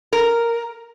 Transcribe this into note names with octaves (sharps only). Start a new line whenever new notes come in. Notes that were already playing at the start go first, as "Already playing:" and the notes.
A#4